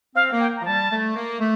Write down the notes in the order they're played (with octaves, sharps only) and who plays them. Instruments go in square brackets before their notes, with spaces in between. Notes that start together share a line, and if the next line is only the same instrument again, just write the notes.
[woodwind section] C4 [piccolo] F5
[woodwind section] A#3
[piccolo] G5
A#5
[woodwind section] F3
[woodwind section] G3 [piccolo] A5
[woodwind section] A3
A#3
A3